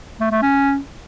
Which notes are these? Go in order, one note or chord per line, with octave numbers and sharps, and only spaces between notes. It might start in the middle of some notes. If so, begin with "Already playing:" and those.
A3
A3
C#4